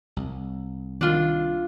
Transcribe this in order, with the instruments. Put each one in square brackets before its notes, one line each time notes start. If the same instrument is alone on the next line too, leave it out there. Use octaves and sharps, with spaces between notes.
[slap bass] C2
[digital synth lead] D#3 [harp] D4 F4